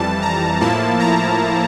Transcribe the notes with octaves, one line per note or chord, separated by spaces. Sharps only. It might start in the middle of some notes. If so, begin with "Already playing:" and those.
Already playing: F2 E3 G3 A5
A#5
A2 F3 A#3 E4 A5
A#5